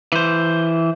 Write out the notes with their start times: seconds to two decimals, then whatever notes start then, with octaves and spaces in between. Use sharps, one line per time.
0.12 E3 C5